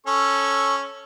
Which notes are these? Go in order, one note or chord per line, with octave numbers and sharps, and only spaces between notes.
C#4 A4 C#6